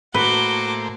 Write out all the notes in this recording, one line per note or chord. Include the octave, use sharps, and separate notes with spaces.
A2 A#3 F#4 B4 C5 D6 G7